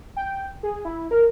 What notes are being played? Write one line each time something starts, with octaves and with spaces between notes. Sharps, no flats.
G5
G#4
E4
A#4